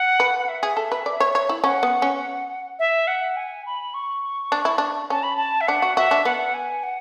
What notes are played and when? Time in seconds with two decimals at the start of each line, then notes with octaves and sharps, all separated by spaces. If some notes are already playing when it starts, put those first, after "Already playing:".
Already playing: F#5
0.20 B4
0.39 F#5
0.48 E5
0.63 G#4
0.77 A4
0.92 B4
1.06 D5
1.20 C#5
1.35 C#5
1.49 E4
1.63 C#4 F#5
1.83 B3
2.02 C#4
2.79 E5
3.07 F#5
3.36 G#5
3.66 B5
3.94 C#6
4.52 D4
4.65 E4
4.78 D4
5.10 C#4 A5
5.23 B5
5.37 A5
5.61 E5
5.68 D4 F#5
5.82 F#4
5.97 F#4 E5
6.11 D4
6.25 B3 F#5
6.54 G#5
6.83 F#5